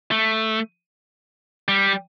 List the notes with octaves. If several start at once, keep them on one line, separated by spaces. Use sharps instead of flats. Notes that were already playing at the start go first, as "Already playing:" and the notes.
A3
G3